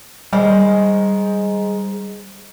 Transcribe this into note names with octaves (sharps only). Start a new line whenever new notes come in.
D#3 G3 G#3 C5